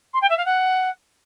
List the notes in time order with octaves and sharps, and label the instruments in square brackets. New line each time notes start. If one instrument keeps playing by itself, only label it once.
[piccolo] C6
G5
E5
F5
F#5